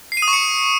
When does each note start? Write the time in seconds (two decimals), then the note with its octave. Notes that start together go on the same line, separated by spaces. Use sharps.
0.12 C7
0.17 D#7
0.22 D#6
0.28 C#6
0.33 C#7